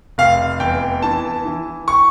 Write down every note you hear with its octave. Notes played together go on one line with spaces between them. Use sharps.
F1 F5
E2 G5
E3 A5
E3
C#6